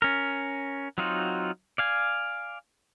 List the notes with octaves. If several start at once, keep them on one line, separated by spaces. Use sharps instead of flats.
C#4 A#4
F#3 C4 D#4 F4 F#4
D5 F5 G#5